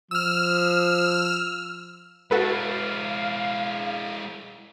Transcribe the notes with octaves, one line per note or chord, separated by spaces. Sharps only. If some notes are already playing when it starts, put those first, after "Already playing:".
F3 E6 F6
G#3 E4 F#4 A4 B4 F5